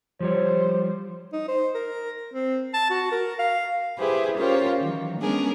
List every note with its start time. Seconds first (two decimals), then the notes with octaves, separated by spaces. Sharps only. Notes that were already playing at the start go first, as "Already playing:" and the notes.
0.20 F3 G3 C5 C#5
1.32 D#4
1.48 C5
1.75 A#4
2.34 C4
2.73 A5
2.90 F#4
3.12 A#4
3.39 F5
3.97 E4 G4 G#4 B4 C5
4.36 C#4 F4 G4 A#4 C5 C#5
4.79 D#3 E3 F#3
5.19 G#3 B3 C#4 D4 G#4 A#4